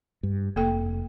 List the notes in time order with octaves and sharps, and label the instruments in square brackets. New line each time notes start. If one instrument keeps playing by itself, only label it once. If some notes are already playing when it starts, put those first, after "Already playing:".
[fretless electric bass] G2
[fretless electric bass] F1 [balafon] A#3 A4 G5